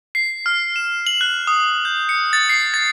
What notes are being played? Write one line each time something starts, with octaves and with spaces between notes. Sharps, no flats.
C7
F6
E7
F#7
F#6
D#6
G6
C#7
A6
C7
A6